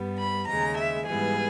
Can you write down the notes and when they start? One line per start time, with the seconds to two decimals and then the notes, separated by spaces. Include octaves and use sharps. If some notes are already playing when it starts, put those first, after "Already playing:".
Already playing: G2 G3 B3
0.19 B5
0.48 D#2 C#3 G#3 A#5
0.78 E5
1.08 G#2 E3 G3 B3 G#4